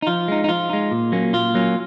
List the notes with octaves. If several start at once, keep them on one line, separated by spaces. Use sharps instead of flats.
D#4
F3 F4
G#3 D#4
D#4
F3 F4
G#3 D#4
A#2
F#3 A#3 C#4
A#2 F4
F#3 A#3 C#4